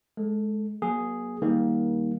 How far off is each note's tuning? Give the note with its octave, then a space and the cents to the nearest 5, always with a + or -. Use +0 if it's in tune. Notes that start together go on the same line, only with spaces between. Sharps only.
G#3 +30 A4 +0
F#3 +0 A#3 +35 G#4 +0
D#3 +20 G3 +10 A#3 +15